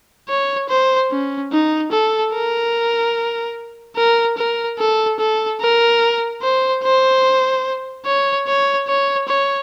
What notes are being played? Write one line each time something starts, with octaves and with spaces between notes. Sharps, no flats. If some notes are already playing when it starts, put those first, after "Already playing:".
C#5
C5
C#4
D#4
A4
A#4
A#4
A#4
A4
A4
A#4
C5
C5
C#5
C#5
C#5
C#5